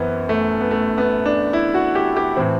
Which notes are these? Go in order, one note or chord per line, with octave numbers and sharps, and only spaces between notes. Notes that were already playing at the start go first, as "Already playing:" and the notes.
Already playing: F#2 E3 B3 C4
A3
B3
A3
B3
D4
E4
F#4
G4
G4
A2 E3 C4